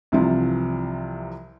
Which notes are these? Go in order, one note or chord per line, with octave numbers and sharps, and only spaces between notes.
C2 C3 E3 F3